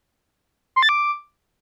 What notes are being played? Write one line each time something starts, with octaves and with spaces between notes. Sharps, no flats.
C6
A6
D6